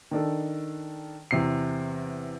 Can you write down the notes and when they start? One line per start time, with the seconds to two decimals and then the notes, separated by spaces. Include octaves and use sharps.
0.11 D#3 D4 A4
1.31 E2 C3 C7